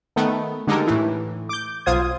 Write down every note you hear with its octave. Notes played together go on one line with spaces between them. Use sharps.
D#3 A3 B3
D3 G#3 D#4 G4 A4 A#4
A2 E3
D6 G6
B1 F4 C5 D#6 G#6